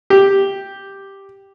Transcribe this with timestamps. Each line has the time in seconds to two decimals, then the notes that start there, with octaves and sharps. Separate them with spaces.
0.10 G4